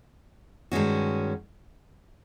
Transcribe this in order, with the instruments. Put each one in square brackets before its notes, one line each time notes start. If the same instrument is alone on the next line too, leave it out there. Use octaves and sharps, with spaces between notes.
[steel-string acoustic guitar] G2 D#3 G#3 C#4 F#4